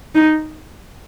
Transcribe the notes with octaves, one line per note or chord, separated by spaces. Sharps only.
D#4